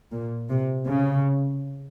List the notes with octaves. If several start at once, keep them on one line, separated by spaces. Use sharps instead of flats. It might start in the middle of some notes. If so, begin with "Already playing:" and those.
A#2
C3
C#3